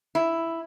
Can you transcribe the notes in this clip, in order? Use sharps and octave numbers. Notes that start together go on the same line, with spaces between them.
E4